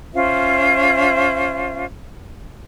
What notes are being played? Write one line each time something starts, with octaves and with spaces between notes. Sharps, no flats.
C#4 F4 C5 E5